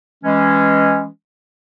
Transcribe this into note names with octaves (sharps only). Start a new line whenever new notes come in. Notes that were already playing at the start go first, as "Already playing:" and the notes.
E3 G#3 C#4